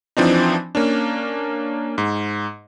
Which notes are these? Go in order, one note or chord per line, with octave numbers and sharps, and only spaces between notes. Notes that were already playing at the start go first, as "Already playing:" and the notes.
E3 F3 C4 D4 D#4
A#3 C#4 D4
G#2